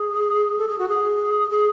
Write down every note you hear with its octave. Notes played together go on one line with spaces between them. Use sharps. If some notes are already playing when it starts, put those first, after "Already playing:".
Already playing: G#4
A4
G#4
F#4
G#4
G#4